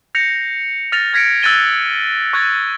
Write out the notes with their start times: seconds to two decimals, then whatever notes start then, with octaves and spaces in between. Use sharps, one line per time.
0.15 G6 A#6 C7 C#7 F7
0.92 F6 A6 A#6 D#7 F7
1.13 F6 G#6 A#6 B6 C#7 D7
1.43 E6 F#6 G#6 A6 D#7 G7
2.33 C#6 F#6 G#6 A6